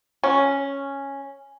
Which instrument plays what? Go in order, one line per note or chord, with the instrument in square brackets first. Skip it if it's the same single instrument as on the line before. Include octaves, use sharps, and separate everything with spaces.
[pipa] C#4